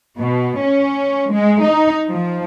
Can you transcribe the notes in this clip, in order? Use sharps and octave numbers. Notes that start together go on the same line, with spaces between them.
B2
C#4
G#3
D#4
F3